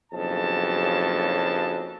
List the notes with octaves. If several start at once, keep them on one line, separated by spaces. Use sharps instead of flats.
F#1 B1 F2 C#3 G#4 A5